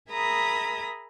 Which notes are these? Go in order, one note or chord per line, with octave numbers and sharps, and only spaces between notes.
G#4 A#4 E5 A#5 B5 D#6